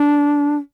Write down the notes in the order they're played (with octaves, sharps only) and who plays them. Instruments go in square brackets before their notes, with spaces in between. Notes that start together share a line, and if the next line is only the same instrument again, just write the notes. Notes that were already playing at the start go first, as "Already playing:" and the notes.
Already playing: [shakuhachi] D4